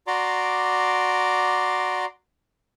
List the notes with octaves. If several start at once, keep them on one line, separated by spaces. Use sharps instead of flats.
F#4 D5 A#5 C6 D6